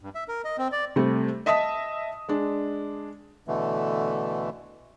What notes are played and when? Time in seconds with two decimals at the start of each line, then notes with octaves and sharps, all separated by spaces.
0.01 G2
0.15 E5
0.28 A#4
0.45 D#5
0.58 C4
0.72 D5
0.96 C3 G3 A3
1.46 D#5 E5 A5 D#6 B6
2.29 G#3 D4
3.48 B2 D3 E3 A3